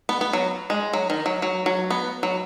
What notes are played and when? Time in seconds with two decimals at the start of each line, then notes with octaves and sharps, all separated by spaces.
0.09 B3
0.21 B3
0.33 F#3
0.70 G#3
0.93 F#3
1.10 D#3
1.26 F#3
1.42 F#3
1.66 F#3
1.90 B3
2.23 F#3